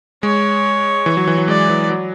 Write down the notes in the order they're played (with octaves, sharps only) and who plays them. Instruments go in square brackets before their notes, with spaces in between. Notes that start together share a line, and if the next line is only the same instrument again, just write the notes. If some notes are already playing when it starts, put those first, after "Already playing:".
[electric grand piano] G#3 [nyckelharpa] C#5
[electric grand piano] E3
F#3
E3
F#3
[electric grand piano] G#3 [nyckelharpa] D5
[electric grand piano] E3
F#3